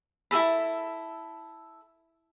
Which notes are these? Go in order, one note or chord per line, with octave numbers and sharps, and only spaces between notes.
E4 G#4 A4 B5